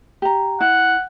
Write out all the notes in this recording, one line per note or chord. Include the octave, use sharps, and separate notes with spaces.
G4 A#5
E4 F#5